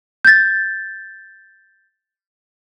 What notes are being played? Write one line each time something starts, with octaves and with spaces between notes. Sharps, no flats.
G6 A6